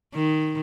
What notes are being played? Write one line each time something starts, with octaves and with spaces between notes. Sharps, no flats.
D#3